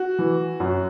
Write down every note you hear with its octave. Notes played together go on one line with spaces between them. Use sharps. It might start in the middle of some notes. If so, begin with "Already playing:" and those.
Already playing: F#4
E3
F#2